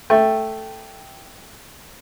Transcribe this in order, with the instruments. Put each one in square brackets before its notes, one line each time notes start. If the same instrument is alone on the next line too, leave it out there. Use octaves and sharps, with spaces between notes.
[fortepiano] A3 [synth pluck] G5